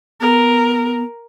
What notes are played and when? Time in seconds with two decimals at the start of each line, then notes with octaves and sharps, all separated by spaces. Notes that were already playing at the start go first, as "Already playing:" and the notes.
0.21 B3 A#4